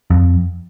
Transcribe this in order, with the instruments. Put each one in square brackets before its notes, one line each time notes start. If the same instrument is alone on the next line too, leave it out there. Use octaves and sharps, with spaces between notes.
[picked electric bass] F2